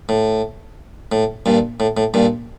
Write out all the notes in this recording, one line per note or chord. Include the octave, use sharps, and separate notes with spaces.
A2
A2
G2 A#2
A2
A2
G2 A#2